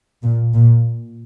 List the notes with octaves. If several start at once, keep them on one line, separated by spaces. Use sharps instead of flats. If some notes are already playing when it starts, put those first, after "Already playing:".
A#2
A#2